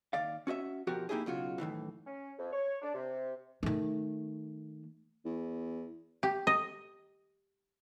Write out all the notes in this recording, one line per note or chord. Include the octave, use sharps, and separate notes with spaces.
D#2 D5 F5
C#4 F#4 D#5 E5
B2 F3 F#4 G4 A#4
A#3 D#4 E4 G4 G#4
B1 C#3 F4 F#4
F#2 A2 D#3 E3
C#4
F2
C#5
D4
C3
D#3 A3
E2
G4
D#5